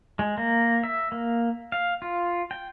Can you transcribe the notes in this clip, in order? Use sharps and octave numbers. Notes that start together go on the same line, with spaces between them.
G#3
A#3
E5
A#3
F5
F4
G5